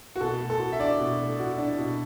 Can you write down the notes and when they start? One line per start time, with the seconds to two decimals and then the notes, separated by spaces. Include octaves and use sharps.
0.16 F#4
0.20 B2 A4
0.41 A3
0.50 A4
0.60 F#4
0.73 E5
0.80 D4 D5
0.99 B2
1.19 A3
1.40 F#4
1.58 D4
1.78 B2